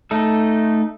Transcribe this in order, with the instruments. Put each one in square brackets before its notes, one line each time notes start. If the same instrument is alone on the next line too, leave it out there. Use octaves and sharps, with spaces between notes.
[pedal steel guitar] A3 D#4 A4